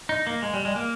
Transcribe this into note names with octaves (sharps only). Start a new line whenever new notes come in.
D#4
A#3
G#3
G3
G#3
A#3